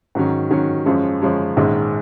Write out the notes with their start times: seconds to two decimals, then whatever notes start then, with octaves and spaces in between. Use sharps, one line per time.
0.15 G#2 D#3 F#3 C#4
0.50 G#2 D#3 F#3 C#4
0.86 F#2 F3 G#3 C#4
1.21 F#2 F3 G#3 C#4
1.57 A#1 G#2 D#3 G#3 C#4